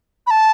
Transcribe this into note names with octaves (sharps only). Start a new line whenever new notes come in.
B5
A5